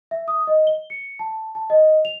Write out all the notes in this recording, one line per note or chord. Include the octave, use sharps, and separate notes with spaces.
E5
D#6
D#5
G7
C#7
A5
A5
D#5
F7